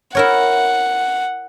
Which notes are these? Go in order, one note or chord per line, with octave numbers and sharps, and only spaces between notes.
E4 A#4 C#5 F#5